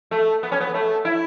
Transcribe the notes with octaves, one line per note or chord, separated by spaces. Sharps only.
A3
B3
C#4
B3
A3
E4